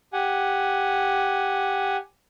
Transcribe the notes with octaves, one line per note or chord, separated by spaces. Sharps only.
G4 F#5 G#5